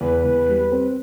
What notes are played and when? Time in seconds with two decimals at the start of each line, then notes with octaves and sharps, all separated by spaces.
0.01 E2 B4
0.24 E2
0.49 G3
0.72 C4